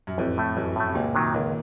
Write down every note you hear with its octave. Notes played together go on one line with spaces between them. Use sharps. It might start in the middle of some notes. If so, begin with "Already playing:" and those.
F#2
A1 F2
A2 A3
A1 F#2
A2 A3
C3
C#2 A#2
C3 D#3 F#3
C#2 D#3